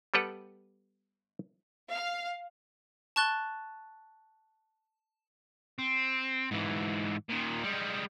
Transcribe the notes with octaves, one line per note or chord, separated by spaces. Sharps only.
G3 B3 G4 A4 B4 F#5
F5
A5 C#6 F#6 A6 G7
C4
G#2 E3
A#2 D#3
G3 G#3